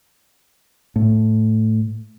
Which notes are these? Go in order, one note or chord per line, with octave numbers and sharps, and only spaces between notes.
A2